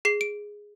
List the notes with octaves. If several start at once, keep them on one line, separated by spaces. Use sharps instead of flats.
G#4 C7
D7